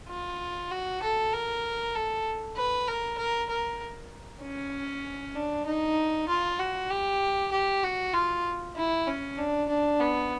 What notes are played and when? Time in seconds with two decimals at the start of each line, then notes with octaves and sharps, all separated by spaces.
0.09 F4
0.71 F#4
1.02 A4
1.33 A#4
1.95 A4
2.57 B4
2.88 A#4
3.18 A#4
3.50 A#4
4.42 C#4
5.36 D4
5.66 D#4
6.28 F4
6.59 F#4
6.91 G4
7.52 G4
7.83 F#4
8.14 F4
8.76 E4
9.07 C#4
9.38 D4
9.69 D4
10.00 B3